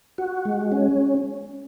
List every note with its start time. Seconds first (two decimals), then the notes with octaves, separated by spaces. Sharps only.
0.18 F#4
0.45 G#3
0.72 C#4